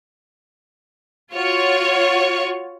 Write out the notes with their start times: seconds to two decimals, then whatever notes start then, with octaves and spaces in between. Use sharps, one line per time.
1.33 F4 F#4 C#5